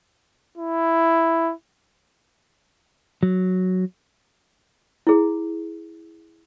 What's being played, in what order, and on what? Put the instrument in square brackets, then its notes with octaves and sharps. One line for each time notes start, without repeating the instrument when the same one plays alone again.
[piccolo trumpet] E4
[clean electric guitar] F#3
[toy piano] E4 G#4